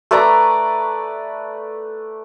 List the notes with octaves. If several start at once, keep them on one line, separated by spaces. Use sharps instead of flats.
A3 B4 D5 A#5